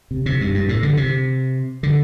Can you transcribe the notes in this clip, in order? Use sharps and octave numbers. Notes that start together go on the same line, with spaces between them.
C3
C3
G2
G2
A2
D3
C3
D3